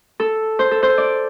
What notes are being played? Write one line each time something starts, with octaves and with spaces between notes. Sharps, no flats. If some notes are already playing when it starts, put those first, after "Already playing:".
A4
C5
A4
C5
D5